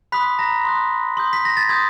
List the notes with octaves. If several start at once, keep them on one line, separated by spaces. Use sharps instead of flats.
B5 C6 D#6 F#6 B6
A#5 A#6
C6 D#6 F#6
C6 D#6 G6
B6
A#6
A6
C6 D#6 G6 G#6